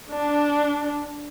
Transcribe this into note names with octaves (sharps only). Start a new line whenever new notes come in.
D4